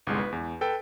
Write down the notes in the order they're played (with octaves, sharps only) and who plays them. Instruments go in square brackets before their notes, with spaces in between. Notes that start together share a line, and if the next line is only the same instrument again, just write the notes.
[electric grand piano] G1 C2 G#3
B4
E2
A4 B4 G5